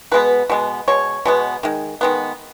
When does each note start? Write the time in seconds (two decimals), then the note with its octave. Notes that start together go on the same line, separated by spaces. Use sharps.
0.12 B2 G#3 B3 B4
0.50 B2 G#3 B3
0.88 B2 G#3 C#5
1.25 B2 G#3 B3
1.63 D#3 G#3
2.01 D#3 G#3 B3